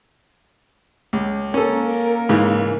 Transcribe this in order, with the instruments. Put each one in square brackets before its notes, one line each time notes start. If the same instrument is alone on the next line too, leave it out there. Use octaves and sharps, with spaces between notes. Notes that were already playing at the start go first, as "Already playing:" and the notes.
[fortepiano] C#2
[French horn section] A#3 A#4 [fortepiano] C#4 A4
[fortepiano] G#2 C#3 E3